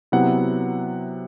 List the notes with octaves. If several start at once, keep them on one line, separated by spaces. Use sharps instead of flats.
C3 F#3 B3 E4 F#5